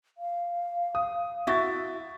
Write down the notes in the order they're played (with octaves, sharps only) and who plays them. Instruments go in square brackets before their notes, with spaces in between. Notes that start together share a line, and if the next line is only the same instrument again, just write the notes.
[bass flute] F5
[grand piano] D#6
[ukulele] E4 F#4 [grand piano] E5 A6